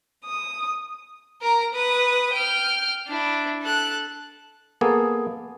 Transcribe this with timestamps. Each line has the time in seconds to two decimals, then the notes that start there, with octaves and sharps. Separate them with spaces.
0.25 D#6
1.42 A#4 A#5
1.74 B4 D#6
2.33 G5 F6
3.07 D4 E4
3.62 A4 F#6
4.81 A#3 B3 G#4 A4